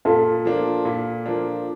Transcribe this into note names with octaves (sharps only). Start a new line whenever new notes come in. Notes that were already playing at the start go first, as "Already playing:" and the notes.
A#2 F4 A4
F3 A#3 D4
A#2
F3 A#3 D4